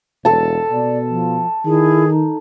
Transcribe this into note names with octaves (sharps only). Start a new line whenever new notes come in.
E1 A4 A5
B2 D5
F3
D#3 E4 G#4
D#4